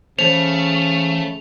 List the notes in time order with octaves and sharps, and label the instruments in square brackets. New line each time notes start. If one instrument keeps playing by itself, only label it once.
[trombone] C#3 [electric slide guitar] E3 C5 [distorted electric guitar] A3 [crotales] F7